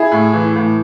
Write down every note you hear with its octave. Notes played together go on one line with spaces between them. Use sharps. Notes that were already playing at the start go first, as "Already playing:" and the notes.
Already playing: E4 G#4
A2
E3
A2